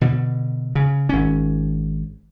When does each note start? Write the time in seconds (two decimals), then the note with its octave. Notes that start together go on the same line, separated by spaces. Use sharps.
0.01 B2 D3
0.75 C#3
1.09 G#1 C#4